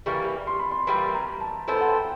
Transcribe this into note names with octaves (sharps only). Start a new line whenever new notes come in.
E3 G3 A#3 C#6
C6
B5
C6
E3 G3 A#3 B5
A#5
A5
B3 E4 A4 C5 G#5
F#5
G5